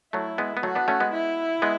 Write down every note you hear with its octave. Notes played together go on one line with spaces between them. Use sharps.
F#3 A3 E4
G#3 B3
B3
F#3 A3 F#4
B3 D4
A3 C#4
G#3 B3
E4
G#3 B3